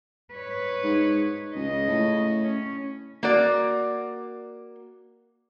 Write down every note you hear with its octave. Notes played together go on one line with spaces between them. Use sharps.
B4 C#5
G#2
C#2 C#3 D#5
A2
C#4
A#3 F#4 D5